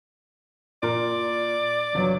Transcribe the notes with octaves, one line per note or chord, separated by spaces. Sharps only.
A#2 A#4 D5
G1 F#3